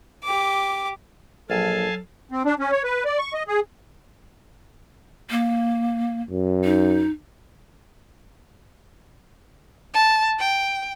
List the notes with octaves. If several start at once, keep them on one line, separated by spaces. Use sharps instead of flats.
G4 D6
A#1 F#3 A4 F5 G#5 A5
C4
D4
C#4
C#5
B4
D5
C#6
D#5
G#4
A#3
F#2
D#4
A5
G5